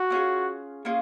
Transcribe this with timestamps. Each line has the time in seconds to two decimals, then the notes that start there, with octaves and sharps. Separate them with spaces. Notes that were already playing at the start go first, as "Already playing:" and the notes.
Already playing: F#4
0.10 A#3 C#4 F4 G#4
0.85 A#3 C#4 F4 G#4